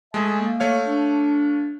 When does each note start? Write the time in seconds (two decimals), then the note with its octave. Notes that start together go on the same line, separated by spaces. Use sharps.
0.14 G#3 A3 G#4 E5 G#5 A5
0.40 A#3
0.60 A3 C#5 F5
0.85 D4